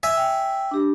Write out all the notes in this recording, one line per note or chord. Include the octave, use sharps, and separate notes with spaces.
E5 G#5
G5
D4 G4